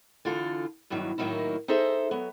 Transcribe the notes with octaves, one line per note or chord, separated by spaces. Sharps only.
D3 E3 F4 A4
E2 G2 D#3 E3 F#3
A2 D#3 F#3 A#3 D#4 E4
D#4 G#4 A4 C5 E5
F#3 B3